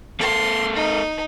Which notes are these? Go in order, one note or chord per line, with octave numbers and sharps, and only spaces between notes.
A#3 A4 C6
D#4